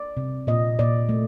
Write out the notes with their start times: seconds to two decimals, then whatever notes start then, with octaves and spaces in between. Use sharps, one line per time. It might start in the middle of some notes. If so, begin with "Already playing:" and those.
Already playing: D5
0.17 C3
0.47 A#2 D#5
0.79 A#2 D5
1.09 A3